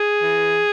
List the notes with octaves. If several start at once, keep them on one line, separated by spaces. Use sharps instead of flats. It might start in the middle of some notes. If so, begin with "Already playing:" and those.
Already playing: G#4
E3